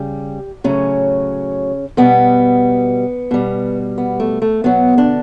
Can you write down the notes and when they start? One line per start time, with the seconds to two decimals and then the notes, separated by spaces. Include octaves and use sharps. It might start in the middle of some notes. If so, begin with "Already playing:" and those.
Already playing: C#3 G3 G4
0.64 A2 C#3 F#3 C#4
1.97 B2 G3 B3
3.31 B2 G3
3.98 B3
4.20 A3
4.42 A3
4.64 B2 F#3 B3
4.97 D3 D4